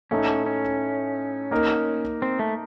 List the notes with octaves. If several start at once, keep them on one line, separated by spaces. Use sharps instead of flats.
A2 A3 C#4 D#4
C#4
A#3 D#4 A#4
C4
A3